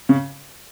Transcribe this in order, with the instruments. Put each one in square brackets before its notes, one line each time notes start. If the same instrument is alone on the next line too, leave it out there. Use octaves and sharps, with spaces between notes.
[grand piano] C#3